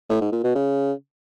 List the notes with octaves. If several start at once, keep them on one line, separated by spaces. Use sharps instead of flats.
A2
G#2
A#2
B2
C#3